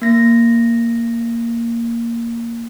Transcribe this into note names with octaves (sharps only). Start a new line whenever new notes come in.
A#3 A#6